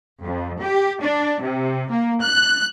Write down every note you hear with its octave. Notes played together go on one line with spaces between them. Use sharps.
F2
G4
D4
C3
A#3
F#6